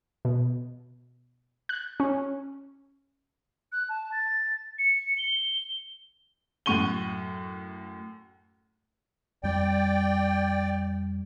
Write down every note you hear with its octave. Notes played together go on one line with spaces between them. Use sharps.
B2
F#6
C#4
F#6
A5
A6
C#7
G7
F#2 A2 F#5 C#6 D#7 G7
F2 G3 D5 G5